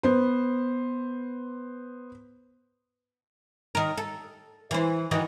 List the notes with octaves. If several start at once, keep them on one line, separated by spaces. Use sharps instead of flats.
B3 C5
D#3 A#4
A4
E3 C5
D#3 E3 F#4